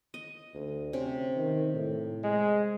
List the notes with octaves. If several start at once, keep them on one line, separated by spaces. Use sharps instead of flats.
D#5
D2
C3 C#4
D#3
A2
G#3